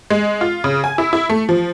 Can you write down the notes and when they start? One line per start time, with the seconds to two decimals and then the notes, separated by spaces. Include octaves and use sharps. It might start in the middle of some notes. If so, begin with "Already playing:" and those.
0.10 G#3
0.41 F4
0.64 C#3
0.84 G#5
0.98 E4
1.13 E4
1.30 A3
1.49 F3